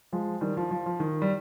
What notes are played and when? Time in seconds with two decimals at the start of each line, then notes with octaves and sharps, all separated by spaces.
0.13 F3 G#3
0.41 D#3 G3
0.57 F3
0.71 F3
0.86 F3
1.00 D#3
1.22 G3